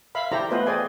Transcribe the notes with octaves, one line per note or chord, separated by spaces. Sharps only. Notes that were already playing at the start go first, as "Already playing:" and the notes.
E5 F5 B5
E4 G4 A4 C5 D5 A#5
A3 B3 F4 B4 C5 D#5
G#4 C5 D5 D#5 G5 G#5